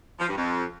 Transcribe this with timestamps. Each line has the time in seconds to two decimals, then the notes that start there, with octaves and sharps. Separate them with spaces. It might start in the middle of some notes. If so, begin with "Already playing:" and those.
0.20 F3
0.28 G2
0.37 F2